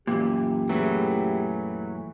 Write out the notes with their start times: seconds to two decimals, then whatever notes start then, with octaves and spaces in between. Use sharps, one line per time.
0.07 F#2 A#2 E3 G4
0.69 E3 F#3 A3 G#4